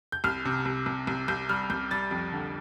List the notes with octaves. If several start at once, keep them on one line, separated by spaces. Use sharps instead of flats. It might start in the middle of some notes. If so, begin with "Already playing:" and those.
G6
C2 F6
C3
C2
C2
C2
C2 G6
G3 F6
C2 G6
G3 A6
F2
D3